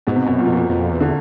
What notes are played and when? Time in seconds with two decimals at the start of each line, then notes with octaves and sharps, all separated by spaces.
0.07 G#2 B2
0.16 C3
0.26 F#2 B2
0.39 A#2
0.46 B2
0.49 F2 A#2
0.69 F2 A#2
0.91 E2
1.00 D3